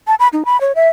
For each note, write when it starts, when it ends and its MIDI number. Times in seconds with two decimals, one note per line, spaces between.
0.07 0.15 81
0.20 0.28 83
0.33 0.43 63
0.45 0.60 83
0.61 0.72 73
0.75 0.89 76